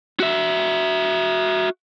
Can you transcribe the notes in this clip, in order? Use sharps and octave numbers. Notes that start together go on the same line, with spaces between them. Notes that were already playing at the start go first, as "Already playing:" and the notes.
F#4 E5